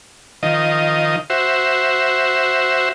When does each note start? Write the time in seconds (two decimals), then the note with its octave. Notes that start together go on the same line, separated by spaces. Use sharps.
0.43 D#3 F3 D#5
1.30 F#4 C5 E5